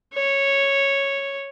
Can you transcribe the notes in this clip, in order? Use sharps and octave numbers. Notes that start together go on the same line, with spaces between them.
C#5